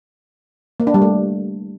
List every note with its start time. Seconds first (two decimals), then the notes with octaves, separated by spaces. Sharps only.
0.80 A#3
0.87 D4
0.94 G3
1.02 A3